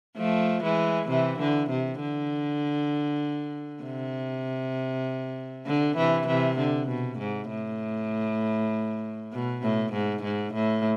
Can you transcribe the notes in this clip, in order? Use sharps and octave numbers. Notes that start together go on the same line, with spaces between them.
F3 A3
E3 G#3
C3 E3
D3
C3
D3
C3
D3
C3 E3
C3 E3
D3
B2
G#2
A2
B2
A2
G#2
G#2
A2